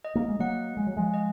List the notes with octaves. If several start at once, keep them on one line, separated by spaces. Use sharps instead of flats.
D#5
A#3
G#3
F#3 A#3 F#5
G#3 F#5
F#3
F3 G#3
D#5